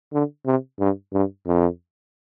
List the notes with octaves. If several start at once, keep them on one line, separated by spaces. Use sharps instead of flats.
D3
C3
G2
G2
F2